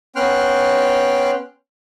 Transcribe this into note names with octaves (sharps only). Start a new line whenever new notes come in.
B3 C#4 G5 C6 F6 F#6